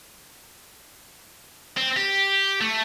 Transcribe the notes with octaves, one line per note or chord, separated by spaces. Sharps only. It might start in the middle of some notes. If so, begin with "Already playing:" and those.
C4
G4
A3